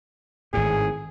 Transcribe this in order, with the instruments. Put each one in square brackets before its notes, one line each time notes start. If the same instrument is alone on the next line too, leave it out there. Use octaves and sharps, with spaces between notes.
[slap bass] G#1 A2 [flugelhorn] G#4